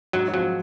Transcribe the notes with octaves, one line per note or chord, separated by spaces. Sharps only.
G#2 F#3
F3 F#3 C4